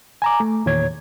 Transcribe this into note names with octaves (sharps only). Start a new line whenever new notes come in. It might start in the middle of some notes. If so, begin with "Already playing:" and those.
G#5 A#5 D6
A3
E2 A#2 D#3 C#5 G#6